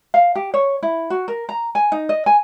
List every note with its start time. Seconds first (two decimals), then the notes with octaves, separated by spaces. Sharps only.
0.14 F5
0.35 G4
0.54 C#5
0.83 E4
1.10 F#4
1.28 A#4
1.49 A#5
1.75 G#5
1.92 D#4
2.09 D#5
2.26 G#5